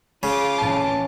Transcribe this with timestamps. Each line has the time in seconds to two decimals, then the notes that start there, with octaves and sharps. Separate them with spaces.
0.23 C#3 F4 D6
0.58 A2 E3 C#4 A5